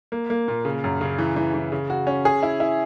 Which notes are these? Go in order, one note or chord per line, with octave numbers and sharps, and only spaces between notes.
A#3
A#3
A#2
C#3
F#2
C#3
E3
E3
E3
C#3
F#4
C#4
G#4
E4
E4